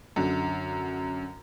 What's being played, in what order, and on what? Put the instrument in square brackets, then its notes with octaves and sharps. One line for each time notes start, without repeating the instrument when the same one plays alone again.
[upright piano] F#2 D3